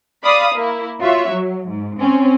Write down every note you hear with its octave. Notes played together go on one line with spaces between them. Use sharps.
D5 F5 B5 D#6
A#3 E4
F4 F#4 C#5 E5
F#3
G#2
C4 C#4